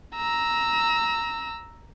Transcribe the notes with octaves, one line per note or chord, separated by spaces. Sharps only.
A#5 E6